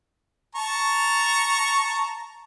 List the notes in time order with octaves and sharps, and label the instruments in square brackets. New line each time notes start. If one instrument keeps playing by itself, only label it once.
[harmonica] A5 A#5 C#6